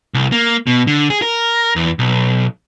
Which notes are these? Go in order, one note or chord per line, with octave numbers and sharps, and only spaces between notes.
C2
A#3
B2
D3
G#4
A#4
E2
B1